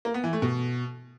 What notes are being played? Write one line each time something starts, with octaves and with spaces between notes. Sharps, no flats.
A#3
B3
E3
A3
B2